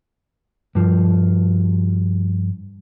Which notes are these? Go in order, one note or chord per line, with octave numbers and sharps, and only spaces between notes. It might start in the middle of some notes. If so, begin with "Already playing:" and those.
G2 F3